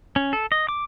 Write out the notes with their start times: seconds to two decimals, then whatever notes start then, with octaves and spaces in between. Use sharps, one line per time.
0.16 C#4
0.33 A4
0.52 D#5
0.69 D6